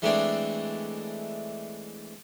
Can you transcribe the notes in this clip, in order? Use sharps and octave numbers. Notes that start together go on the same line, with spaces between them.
E3 G#3 A3 C4 D4